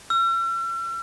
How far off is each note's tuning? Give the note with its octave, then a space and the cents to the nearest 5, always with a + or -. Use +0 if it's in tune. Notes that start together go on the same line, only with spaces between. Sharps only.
E6 +45